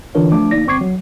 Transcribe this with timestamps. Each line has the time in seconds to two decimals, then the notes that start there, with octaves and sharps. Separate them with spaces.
0.15 D3 E3 D4 F4 A#4 C#5
0.32 F3 A3 D4 D6
0.51 G1 A#3 D#4 D5 A#6
0.67 G1 C4 C#6 D6 G#6 C7
0.81 F#3